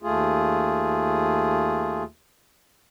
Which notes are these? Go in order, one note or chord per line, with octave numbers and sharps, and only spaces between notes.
D#2 A3 F4 G#4